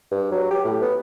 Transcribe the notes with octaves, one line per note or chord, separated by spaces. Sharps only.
G2
F#3
G4
A2
B3